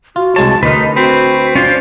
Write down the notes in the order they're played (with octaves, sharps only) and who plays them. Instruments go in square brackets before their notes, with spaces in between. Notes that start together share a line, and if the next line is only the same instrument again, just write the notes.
[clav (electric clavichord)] F4 [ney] F#4
[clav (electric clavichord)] C2 G#3 C#5 [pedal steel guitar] A5
[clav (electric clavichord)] D2 A#4 [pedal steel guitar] D#4 B4 [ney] D#5
[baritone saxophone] C4 [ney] F#4 [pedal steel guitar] B4
[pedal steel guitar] C#4 D4 C5 [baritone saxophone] F4